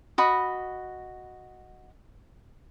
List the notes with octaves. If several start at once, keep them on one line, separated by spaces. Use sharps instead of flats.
F#4 D#5 B5